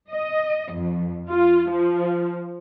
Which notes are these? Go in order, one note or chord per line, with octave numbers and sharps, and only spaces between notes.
D#5
F2
F4
F3